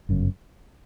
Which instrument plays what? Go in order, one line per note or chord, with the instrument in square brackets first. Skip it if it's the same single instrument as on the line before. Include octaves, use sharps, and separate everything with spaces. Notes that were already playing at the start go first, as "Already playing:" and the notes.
[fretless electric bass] G1 F#2 C#3